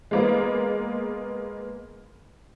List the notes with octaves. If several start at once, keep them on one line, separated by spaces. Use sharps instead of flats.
G#3 A#3 B3